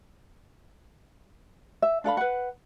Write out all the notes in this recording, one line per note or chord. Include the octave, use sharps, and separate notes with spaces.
E5
D4 A4 F5 B5
B4 F#5